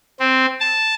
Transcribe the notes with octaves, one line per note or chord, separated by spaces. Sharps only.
C4
A5